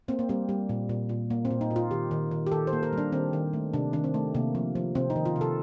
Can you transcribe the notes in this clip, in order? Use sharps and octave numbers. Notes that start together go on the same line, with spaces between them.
A#3 C4
A#3
G3 C4
G3
A#2
A#2
A#2
A#3
C4
A#2
D#4
A#2
F4
D#3 G4
D#3
D#3
G4
D#3 A4
C5
A#3
A#4
G3
D4
D#3 C4
D#3
A3
C3 D4
D#3 D4
C4
A3
C3 A#3
F3
F3
C3 C4
D#4
D#3
F4
C3
A4